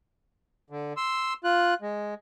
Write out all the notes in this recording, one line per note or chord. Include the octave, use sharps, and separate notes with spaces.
D3
C6 E6
F4 F#6
G#3